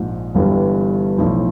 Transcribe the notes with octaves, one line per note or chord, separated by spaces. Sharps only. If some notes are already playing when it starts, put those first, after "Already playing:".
Already playing: A#1 G#2 F3
G1 G2 E3 G3
B1 A2 F3